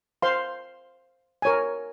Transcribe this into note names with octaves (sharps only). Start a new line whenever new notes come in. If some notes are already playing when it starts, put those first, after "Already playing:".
C5 F5 C6
A#4 C#5 G#5